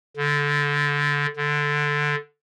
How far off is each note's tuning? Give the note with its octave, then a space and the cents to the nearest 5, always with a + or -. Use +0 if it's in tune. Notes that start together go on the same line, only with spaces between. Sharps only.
D3 -15
D3 +0